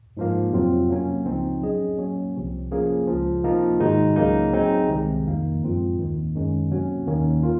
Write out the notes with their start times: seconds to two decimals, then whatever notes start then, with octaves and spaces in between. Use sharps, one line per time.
0.17 G#2 F3 A#3
0.53 F2 C3 F#3 C4 F4
0.89 F#3 A#3 C#4
1.25 C#2 C#3 F3 C4 D#4
1.62 F#3 C#4 G#4 D#5
1.98 F#3 A#3 C#4
2.35 C2 C3 F3
2.72 F3 A#3 C#4 G#4
3.07 C#2 C#3 F3
3.44 C3 F3 A#3 D#4
3.80 G#2 D#3 G#3 D#4 F#4
4.16 C#2 C#3 F#3 A#3 D#4
4.53 F#3 C4 D#4 G#4
4.89 C2 C3 D#3 G#3
5.25 F2 D#3 A#3
5.62 F#2 F3 G#3 C4 F4
5.99 D#2 D#3 A#3
6.35 F#2 D#3 G#3 C#4
6.71 C3 F#3 A#3 C#4 F#4
7.07 D#2 D#3 A#3 C#4
7.43 A#3 F4